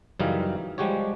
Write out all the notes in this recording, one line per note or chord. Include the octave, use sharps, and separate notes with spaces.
F#2 C#3 E3 G3 D#4 F5
F3 G3 G#3 F#4 G4 C#5